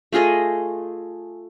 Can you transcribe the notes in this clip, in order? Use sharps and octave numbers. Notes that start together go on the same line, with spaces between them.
A3 F4 G#4 D#5